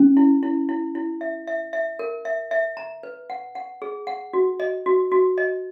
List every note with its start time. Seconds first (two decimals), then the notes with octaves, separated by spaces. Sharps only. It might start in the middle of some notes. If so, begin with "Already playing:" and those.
Already playing: C#4
0.17 E4
0.43 E4
0.69 E4
0.95 E4
1.21 E5
1.47 E5
1.73 E5
1.99 A#4
2.25 E5
2.51 E5
2.77 A#5
3.03 B4
3.30 F#5
3.55 F#5
3.82 G#4
4.07 F#5
4.33 F#4
4.60 D#5
4.86 F#4
5.12 F#4
5.38 D#5